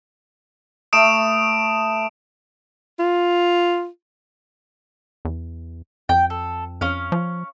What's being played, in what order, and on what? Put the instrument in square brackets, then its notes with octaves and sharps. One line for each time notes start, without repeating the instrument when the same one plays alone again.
[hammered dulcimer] A3 B4 [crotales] D#6 D7 E7
[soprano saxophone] F4
[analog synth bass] E2
[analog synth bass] F2 [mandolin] G5
[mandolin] A4
[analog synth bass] F2 [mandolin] C#4 F5
[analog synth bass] F3